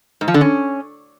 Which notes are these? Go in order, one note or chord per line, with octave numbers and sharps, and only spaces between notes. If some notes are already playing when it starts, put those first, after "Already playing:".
G#2
F3
D3
C#4